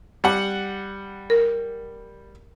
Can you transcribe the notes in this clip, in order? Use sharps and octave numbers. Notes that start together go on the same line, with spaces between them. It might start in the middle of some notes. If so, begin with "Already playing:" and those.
G3 F#5
A#4